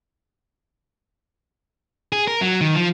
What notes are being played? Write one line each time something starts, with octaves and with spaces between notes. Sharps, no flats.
G#4
A#4
F#3
D#3
F3